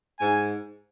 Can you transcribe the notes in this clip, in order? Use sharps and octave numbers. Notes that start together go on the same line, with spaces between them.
G#2 G#5